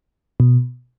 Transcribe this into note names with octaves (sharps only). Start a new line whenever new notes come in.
B2